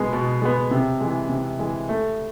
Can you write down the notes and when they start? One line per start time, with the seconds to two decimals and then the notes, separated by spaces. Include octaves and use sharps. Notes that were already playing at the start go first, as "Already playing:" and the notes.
Already playing: B2 G#3 B3
0.13 B2
0.42 G#3 B3
0.71 C3
1.00 E3 G#3
1.29 C3
1.59 E3 G#3
1.89 A3